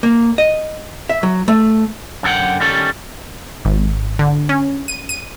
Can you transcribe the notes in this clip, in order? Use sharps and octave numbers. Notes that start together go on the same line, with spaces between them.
A#3
D#5
E5
F#3
A3
F#2 D3 A4 F#5 G5
D#3 G3 C#4 A4
G#1
D3
C#4
D#7
D#7